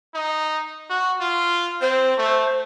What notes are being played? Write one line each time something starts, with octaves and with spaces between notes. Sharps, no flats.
D#4
F#4
F4
C4 C5
A3